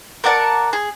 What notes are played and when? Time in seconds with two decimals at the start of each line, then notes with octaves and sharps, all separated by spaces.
0.24 A#4 D5 F#5 A5
0.73 G#4